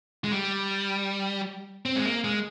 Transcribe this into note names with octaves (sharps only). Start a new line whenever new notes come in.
G#3
G3
C4
G#3
A#3
G#3